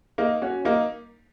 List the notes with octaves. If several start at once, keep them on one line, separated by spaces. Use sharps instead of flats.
A#3 D#4
C#4 F#4
A#3 D#4